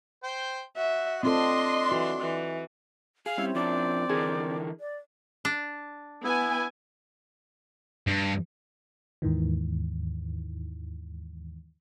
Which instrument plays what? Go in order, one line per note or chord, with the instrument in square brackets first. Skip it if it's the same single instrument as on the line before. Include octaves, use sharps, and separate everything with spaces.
[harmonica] C5 G5
[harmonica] F#4 [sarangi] E5
[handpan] C4 F4 A4 [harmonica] D4 [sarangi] D#5 [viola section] C6
[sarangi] E3 [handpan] F#4
[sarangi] E3
[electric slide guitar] G#4 [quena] F5
[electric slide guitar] G3 [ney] C4 [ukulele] C#4 E4
[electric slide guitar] F3 D4 [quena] D5
[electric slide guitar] D3 E3 A#4 [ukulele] G#4
[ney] D5
[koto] D4
[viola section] B3 G#5 [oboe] E4
[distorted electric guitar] G2
[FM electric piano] D#2 G#2 D#3 E3